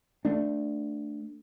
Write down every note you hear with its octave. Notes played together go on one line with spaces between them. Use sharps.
A3 D4